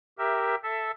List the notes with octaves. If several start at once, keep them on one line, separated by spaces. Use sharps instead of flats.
G4 A#4 E5
A4 E5